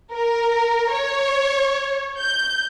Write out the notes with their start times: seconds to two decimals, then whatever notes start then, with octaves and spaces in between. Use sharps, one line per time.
0.14 A#4
0.93 C#5
2.20 G6